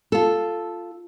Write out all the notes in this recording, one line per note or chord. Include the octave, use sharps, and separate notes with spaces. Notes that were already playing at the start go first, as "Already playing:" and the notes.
F4 A4